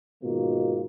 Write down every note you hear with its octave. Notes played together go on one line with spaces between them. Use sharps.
G#2 B2 D#3 A#3 F4